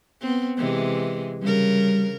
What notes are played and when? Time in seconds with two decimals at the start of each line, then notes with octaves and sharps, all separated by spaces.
0.21 B3 C4
0.57 C3 E3 G#3
1.42 C#3 G3 A#4